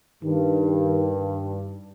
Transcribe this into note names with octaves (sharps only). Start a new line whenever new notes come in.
G2 D#3